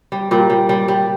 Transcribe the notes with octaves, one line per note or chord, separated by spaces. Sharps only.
G3
A#2 G3
G3
G3
G3